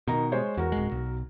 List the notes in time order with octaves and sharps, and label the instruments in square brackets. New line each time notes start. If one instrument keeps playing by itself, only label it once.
[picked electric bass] B2 [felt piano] D#3 A#5
[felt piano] G#3 C5 C#5
[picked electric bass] E2 [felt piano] F#4 A#4
[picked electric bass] D1 G#3
B1